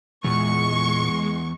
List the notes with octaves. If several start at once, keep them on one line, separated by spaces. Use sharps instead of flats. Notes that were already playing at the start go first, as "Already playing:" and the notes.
E2 A#2 G#3 C#6